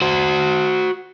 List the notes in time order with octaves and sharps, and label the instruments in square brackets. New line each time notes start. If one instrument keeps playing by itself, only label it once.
[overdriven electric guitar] F#4 C5